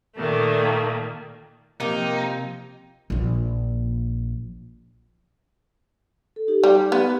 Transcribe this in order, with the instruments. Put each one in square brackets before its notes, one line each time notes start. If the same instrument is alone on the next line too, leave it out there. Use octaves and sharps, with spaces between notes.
[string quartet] A#2 D#3 A3 A#3
[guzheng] C3 [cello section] F3 [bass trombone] A#3 [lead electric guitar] D#4
[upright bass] A#1 F3
[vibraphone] A4
D#4 G4
[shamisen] G3
B3